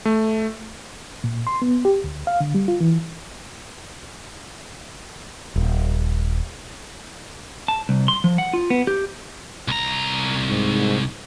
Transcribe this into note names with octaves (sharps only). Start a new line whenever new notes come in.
A3
A#2
C6
B3
G4
D2
F5
D3
G3
F4
E3
D#1
A5
C2
C6
F3
F#5
F4
B3
G4
C2 A#5
G#2